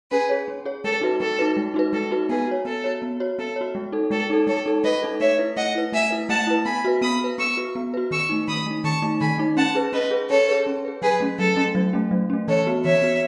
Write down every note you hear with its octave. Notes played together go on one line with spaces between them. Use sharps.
C#4 G#4 B4
G#4 C#5
C#4
G#4 C#5
G#3 A4
D#4 F#4 B4
G#3 A4
D#4 F#4 B4
G#3
D#4 F#4 B4
G#3 A4
D#4 F#4 B4
B3 G#4 B4
F#4 C#5
B3 A4
F#4 C#5
B3
F#4 C#5
B3 A4
F#4 C#5
G#3
D#4 A4
G#3 A4
D#4 A4
G#3 A4 C#5
D#4 A4
G#3 B4 D#5
D#4 A4
A3 C#5 E5
E4 B4
A3 D#5 F#5
E4 B4
A3 E5 G#5
E4 B4
A3 F#5 A5
E4 B4
B3 G#5 B5
F#4 B4
B3 B5 D#6
F#4 B4
B3 C#6 E6
F#4 B4
B3
F#4 B4
D#3 C#6 E6
A3 D#4
D#3 B5 D#6
A3 D#4
D#3 A5 C#6
A3 D#4
D#3 G#5 B5
A3 D#4
C#4 F#5 A5
G#4 B4
C#4 B4 D#5
G#4 B4
C#4 A4 C#5
G#4 B4
C#4
G#4 B4
F#3 G#4 B4
A3 C#4
F#3 A4
A3 C#4
F#3
A3 C#4
F#3
A3 C#4
E3 A4 C#5
B3 F#4
E3 C#5 E5
B3 F#4